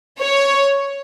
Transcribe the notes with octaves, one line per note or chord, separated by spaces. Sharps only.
C#5